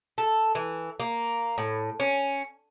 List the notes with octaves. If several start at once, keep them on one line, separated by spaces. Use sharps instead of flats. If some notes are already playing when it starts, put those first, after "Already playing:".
A4
E3
A#3
A2
C#4